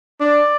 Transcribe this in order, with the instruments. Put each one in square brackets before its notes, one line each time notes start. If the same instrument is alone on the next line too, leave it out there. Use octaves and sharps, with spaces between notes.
[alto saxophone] D4 [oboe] D5